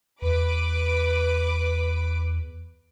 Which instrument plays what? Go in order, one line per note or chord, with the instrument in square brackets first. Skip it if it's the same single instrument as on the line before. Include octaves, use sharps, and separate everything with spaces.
[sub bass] E2 [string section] B4 D6